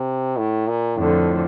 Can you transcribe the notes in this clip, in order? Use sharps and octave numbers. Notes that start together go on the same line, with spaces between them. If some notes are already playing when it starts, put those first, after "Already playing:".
Already playing: C3
A2
A#2
F2 A2 D3 F3